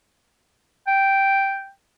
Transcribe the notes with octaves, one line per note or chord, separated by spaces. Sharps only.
G5